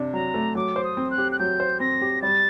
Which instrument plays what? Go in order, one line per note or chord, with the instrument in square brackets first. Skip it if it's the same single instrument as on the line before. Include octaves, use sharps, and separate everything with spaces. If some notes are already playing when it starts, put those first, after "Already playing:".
Already playing: [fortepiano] C3 D4
[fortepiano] F#3 [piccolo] A#5
[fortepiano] A3
[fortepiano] F#3 [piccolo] D6
[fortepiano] C5
[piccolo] D#6
[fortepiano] C4
[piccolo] F#6
[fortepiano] G4
[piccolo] F#6
[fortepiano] F#3 [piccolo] G6
[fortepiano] C5
[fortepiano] C4 [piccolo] A#6
[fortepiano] G4
[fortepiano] G3 [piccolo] A6